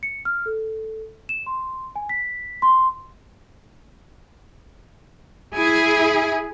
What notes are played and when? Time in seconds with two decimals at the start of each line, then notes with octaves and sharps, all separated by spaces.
0.03 C#7
0.25 F6
0.46 A4
1.29 E7
1.46 C6
1.96 G#5
2.09 B6
2.62 C6
5.54 E4 G#4